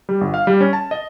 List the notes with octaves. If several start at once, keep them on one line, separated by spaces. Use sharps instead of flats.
G3
G1
F5
G3
C#4
A5
D#5